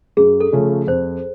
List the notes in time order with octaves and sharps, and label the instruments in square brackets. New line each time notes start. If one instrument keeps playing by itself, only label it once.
[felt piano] F#2 [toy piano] G#4
[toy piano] A4
[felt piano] C#3 F3 A3 C#4
[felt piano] F2 [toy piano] C5